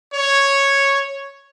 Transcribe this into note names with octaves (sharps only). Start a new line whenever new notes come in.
C#5